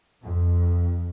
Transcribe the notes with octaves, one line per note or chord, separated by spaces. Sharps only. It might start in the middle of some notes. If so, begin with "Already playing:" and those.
F2